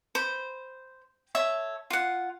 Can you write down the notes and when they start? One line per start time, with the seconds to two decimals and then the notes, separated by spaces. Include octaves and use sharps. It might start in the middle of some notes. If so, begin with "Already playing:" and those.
0.15 C5 B5
1.35 A4 C#5 E5
1.90 F4 F#5